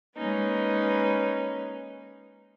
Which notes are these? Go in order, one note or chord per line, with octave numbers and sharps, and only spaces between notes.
G#3 A#3 C#4 D#4 B4